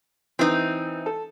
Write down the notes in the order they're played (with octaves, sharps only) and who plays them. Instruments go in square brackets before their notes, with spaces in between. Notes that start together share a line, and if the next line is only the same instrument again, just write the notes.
[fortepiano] E3 [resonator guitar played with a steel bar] C4 D#4
[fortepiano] A4